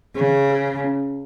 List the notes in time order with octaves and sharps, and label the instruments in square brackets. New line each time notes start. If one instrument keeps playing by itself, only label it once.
[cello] C#3 [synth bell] G#4
[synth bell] G#4
C#4